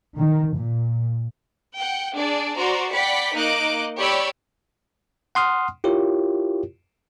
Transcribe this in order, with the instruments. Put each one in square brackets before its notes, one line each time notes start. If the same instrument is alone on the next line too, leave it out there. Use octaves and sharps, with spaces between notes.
[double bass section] D#3
A#2
[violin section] F#5 G5
D4 G#4 D5
F#4 C5 D5 A#5 C6
D5 F#5 G5 B5 B6 C#7
A#3 D#4 D#5 D6 F#6 D7
G4 C#5 D5 B5 E6
[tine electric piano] F#5 C6 D#6 F6
E4 F4 G4 A#4 C#5